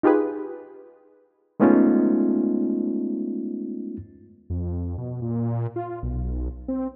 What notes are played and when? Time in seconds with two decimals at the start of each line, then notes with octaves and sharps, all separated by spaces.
0.03 D#4 F4 G4 G#4 B4
1.60 G#3 A3 B3 C#4 D#4 F4
4.50 F2
4.98 B2
5.22 A#2
5.76 F4
6.03 B1
6.68 C4